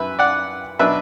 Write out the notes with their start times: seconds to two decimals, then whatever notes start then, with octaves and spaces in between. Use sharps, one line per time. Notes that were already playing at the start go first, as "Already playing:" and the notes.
Already playing: F#2 B4 E5
0.19 D5 F#5
0.79 B2 F#3 D4 B4 E5